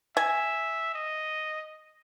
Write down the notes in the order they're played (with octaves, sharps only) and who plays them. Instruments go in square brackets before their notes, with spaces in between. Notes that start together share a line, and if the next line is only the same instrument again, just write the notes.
[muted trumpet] E5 [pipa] G#5
[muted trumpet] D#5